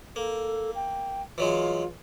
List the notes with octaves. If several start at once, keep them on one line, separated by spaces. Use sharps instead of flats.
A#3 A4
G5
E3 F#3 G#3 F4